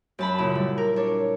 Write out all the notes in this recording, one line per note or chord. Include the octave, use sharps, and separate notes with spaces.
F#2 A5 B5
A#2 C#3 E4
G3
A#4
D4 C#5